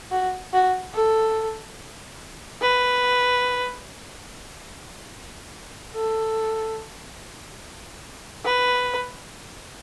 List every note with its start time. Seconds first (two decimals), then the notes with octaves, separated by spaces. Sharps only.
0.11 F#4
0.53 F#4
0.94 A4
2.62 B4
5.95 A4
8.45 B4